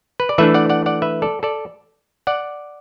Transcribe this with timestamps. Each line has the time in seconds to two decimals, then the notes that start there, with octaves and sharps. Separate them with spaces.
0.20 B4
0.29 D5
0.38 E3 A3 D4 B4 E5
0.54 D5 F#5
0.69 D5 F#5
0.86 D5 F#5
1.02 B4 E5
1.22 A4 D5
1.43 A4 D5
2.27 D5 F#5